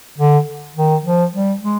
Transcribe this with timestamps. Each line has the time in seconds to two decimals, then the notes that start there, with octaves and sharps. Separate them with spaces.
0.18 D3
0.76 D#3
1.05 F3
1.33 G3
1.61 G#3